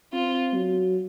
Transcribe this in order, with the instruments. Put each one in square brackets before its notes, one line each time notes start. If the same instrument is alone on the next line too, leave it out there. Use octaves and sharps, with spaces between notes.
[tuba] C4 [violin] F4
[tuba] F#3